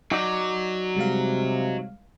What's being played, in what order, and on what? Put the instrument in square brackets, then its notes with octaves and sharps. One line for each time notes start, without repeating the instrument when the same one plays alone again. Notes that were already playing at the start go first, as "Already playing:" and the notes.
[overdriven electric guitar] F#3 [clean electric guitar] D#4 F#4 D5
[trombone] C3 [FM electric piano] G3 G#3 F5